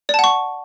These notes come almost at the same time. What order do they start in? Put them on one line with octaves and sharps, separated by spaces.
D5 A5 F#5 C#6